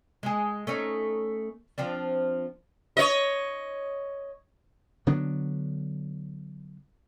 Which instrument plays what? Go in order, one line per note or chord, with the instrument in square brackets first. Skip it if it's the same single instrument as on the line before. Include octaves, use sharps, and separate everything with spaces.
[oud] G#3 G#4
A3 C#4 D#4
F3 C4 D4
[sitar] C#5 D#5
[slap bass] D3 F#3 B3 D4